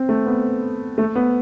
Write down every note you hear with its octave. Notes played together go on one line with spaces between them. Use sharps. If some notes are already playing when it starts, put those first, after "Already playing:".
Already playing: C4
A3
B3
A3
B3